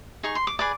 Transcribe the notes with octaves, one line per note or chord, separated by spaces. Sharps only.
D#4 G#4 C#6
C6
D6
G#4 B4 D5 D6